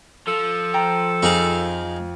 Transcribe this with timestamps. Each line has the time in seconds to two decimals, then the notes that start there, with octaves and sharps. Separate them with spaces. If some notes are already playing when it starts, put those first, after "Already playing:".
0.27 F3 A4
0.74 G5 A#5
1.23 F2 D#4 G#4 F5